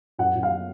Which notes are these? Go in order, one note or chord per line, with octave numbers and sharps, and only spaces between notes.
F#2 F#5
F#2
F5